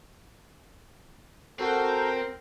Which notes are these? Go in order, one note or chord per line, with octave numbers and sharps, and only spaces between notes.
C4 F#4 A4 A#4 G6